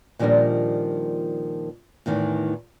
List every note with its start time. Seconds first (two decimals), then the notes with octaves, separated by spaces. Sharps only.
0.19 A#2 D#3 F3 G3 D4 A#4
2.06 E2 A2 D#3 E3